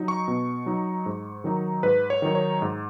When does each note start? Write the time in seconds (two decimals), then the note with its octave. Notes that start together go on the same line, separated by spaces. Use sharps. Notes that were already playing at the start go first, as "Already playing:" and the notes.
Already playing: F#3 D#4
0.08 C#6
0.28 B2
0.66 F#3 D#4
1.06 G#2
1.44 D#3 F#3 D#4
1.83 G#2 B4
2.10 C#5
2.22 D#3 F#3 D#4
2.35 C#5
2.62 G#2